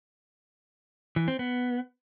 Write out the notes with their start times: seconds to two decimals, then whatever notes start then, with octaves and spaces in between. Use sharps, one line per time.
1.16 E3
1.28 C4
1.39 B3